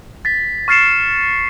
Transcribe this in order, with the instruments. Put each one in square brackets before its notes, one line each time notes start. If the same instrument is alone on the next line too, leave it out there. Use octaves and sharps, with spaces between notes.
[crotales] A6 B6
C#6 F6 A6 C7 C#7 E7